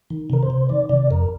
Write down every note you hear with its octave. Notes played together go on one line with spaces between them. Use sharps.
D#3
C3 A#4
C5
C3
D#3 D5
C3 D5
F2 A#4